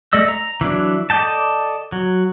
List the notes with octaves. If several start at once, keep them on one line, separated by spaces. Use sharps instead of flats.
A3 D5 D#5 E6
A#5
E3 F#3 D4
A4 D5 D#5 G5 A5
F#3